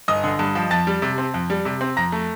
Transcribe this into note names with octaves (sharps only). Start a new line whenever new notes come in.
G1 D#5 D#6
D3
G2
F3
F2 A5 A6
G3
C3
C4
F2
G3
C3
C4
F2 A#5 A#6
A3